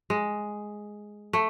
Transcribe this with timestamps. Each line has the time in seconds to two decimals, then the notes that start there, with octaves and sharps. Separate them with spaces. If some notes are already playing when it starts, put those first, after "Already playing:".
0.10 G#3
1.33 A3